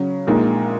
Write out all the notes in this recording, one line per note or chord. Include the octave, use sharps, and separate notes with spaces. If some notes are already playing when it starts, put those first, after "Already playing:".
Already playing: C#3 F#3 C#4
A#1 A#2 G#3 D#4